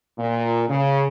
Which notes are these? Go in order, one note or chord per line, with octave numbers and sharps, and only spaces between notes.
A#2
C#3